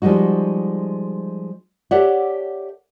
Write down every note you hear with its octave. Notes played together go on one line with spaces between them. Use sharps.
F3 G3 G#3 D#4 F#4
G4 A4 C#5 D5 E5 F#5